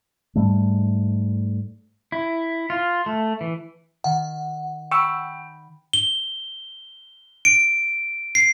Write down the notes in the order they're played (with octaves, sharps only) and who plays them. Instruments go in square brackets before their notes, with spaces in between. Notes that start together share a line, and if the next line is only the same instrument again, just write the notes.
[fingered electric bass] G#2 G3 A3
[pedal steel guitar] E4
F4
A3
E3
[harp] D#3 [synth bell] F#5
[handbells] G5 [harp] B5 [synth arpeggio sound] C#6 E6
[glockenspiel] G7
D7
C7